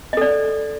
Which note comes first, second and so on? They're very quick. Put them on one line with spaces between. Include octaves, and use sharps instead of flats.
D#5 A4 D5